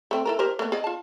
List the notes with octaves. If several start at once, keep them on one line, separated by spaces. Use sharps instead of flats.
A3 C4
E4 A4 A#4
G4 A#4 C5
A3 B3
G#4 D5 D#5
F4 A5